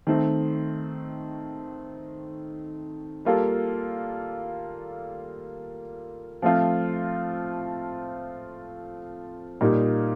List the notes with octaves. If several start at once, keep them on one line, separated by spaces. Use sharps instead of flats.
D#3 A3 C4
G3 A#3 F4 A4
F3 A3 C4 F4
A#2 G3 A#3 D#4